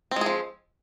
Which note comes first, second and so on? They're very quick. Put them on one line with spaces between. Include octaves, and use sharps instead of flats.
C4 G#3 G#4 F3